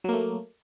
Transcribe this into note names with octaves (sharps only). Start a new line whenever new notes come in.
F#3 A3 A#3